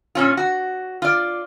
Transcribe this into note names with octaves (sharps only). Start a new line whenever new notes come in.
A#2 C#4 F4
F#4
F4 D5